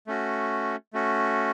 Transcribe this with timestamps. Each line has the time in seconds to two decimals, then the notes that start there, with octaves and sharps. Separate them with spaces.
0.07 A3 C#4 F#4
0.93 A3 C#4 F#4